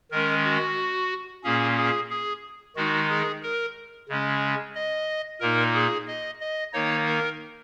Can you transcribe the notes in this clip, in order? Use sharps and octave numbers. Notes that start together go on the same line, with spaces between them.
D#3 G#3 C#4 A#4
F#4
A#2 A#3 C#4 G#4
G#4
G#4
D#3 G#3 D#4 F#4
G#4
A#4
C#3 G#3 C#4
D#5
A#2 A#3 D#4 A#4
G#4
D#5
D#5
D#3 A#3 D#4 C#5
A#4